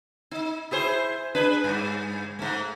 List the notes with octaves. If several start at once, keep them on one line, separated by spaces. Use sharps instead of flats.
D#4
E4 G#4 C5
D4 G#4 B4
G2
G#2 A3